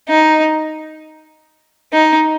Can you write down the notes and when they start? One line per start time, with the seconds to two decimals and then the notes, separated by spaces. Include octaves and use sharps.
0.09 D#4
1.93 D#4